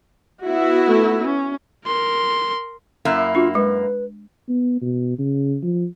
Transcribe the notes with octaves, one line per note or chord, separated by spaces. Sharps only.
B3 E4 F#4
A3
C#4
A#4 C6
F#2 A#3 E4
D4 F4 F#4
G#3 B4
B3
B2
C#3
F3